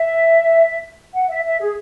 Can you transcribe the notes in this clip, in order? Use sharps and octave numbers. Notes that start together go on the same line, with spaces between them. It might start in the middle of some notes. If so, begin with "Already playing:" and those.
Already playing: E5
F#5
E5
E5
G#4